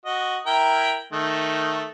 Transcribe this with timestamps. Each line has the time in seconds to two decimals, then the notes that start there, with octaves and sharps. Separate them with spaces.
0.06 F#4 D#5
0.47 E4 A#4 G5
1.13 D#3 A3